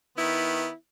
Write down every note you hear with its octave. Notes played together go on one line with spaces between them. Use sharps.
D#3 B3 E4